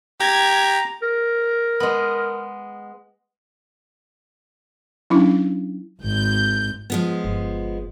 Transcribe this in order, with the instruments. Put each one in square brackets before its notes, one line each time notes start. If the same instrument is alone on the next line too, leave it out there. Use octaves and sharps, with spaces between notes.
[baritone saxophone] G4 [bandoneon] A#5 [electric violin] G#6
[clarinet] A#4
[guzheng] G#3 B3
[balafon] F#3 C#4 D4 E4
[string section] G#1 G6
[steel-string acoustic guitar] F3 G#3 B3
[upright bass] G1